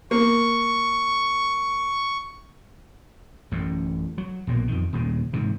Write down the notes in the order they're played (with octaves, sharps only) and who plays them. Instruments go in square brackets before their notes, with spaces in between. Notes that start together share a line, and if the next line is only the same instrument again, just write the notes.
[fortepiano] A#3 [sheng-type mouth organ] C#6
[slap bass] A1 F#2 A2
F#3
A#1 B2 E3 A#3
F2 D#3
D#1 D#2 A2 C#3
G#2 C3 E3